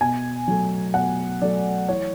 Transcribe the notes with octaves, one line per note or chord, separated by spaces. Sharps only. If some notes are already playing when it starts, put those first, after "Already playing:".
B2 G#5
F#3 A3
B2 F#5
F#3 A3 D5
E3 C#5